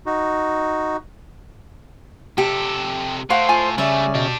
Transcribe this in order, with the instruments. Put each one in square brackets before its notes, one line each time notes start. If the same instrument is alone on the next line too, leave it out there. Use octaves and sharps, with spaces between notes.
[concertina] D#4 F#4
[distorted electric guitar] C3 A4 [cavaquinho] G4
[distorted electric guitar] A2 [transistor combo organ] C5 [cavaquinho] F5 F#5 C#6
[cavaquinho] F4 [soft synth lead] G#5
[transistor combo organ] C#3 [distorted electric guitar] G3 A3 [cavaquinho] D5 E5
[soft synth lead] B2 [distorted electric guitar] D4 G4